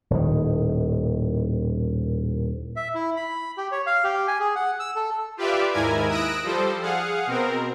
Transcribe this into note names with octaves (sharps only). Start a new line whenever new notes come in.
D#1 A2 D#3
E5
E4
B5
G4
C#5
F5
G4
G#5
G#4
F#5
E6
A4
F4 G4 B4 D5 E5 F5
D#2 G#2 E4 A#4 G#5 G#6
D#6 E6 F#6 A#6 D7
F3 G3 A4 C5
G#4 F5 F#5
B2 C4 A#4